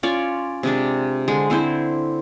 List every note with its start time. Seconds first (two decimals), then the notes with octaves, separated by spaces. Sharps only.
0.03 C#4 F4 C#5 D5
0.63 C3 G#3 D4
1.28 D3 G#3
1.50 D3 C4 E4 C5